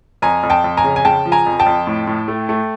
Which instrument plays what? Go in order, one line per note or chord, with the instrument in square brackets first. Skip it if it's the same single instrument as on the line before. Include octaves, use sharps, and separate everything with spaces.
[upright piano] F2 G#5 A#5
F2
G5 A5
F2
G#5 A#5
C#3
G#5
C#3 G5 A5
F3
G#5 A#5
F2
G5 A5
F2
A2
A2
A3
A3